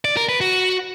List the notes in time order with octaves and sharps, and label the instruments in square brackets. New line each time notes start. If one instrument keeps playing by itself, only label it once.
[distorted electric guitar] D5
A#4
B4
F#4